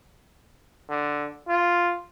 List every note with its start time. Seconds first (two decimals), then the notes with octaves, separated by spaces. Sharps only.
0.89 D3
1.49 F4